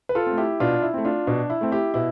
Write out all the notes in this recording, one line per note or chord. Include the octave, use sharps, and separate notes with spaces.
B4
F4 A4
C4
A3
E4 G4
B2 D4 F4
E4
A3 C4
D4 F4
B2 D4
E4
A3 C4
E4 G4
B2 E4